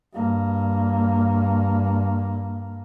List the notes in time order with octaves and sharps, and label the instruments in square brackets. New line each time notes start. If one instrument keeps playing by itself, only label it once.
[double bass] G2 A#3